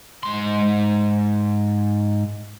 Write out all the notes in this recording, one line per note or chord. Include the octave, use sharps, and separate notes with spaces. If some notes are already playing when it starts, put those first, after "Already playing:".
G#2 C6